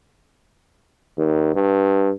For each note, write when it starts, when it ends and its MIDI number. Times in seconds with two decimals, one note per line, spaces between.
1.18 1.53 39
1.55 2.11 43